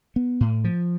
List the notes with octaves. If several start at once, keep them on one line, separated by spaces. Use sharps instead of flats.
B3
A2
F3